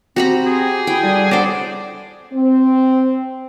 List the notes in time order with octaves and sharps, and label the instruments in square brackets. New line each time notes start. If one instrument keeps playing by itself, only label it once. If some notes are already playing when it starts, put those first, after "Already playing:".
[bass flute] C4 [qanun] F#4 A#5 B5 [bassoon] G4
[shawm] G#4
[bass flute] E4 [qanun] G5
[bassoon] D3 [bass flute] G3
[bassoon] A2 [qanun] D4 C5 [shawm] D5 [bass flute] F#5
[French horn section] C4